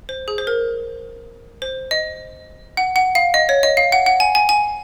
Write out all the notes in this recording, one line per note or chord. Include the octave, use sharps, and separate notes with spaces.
C5
G#4
C5
A#4
C5
D#5
F#5
F#5
F5
D#5
C#5
D#5
F5
F#5
F#5
G#5
G#5
G#5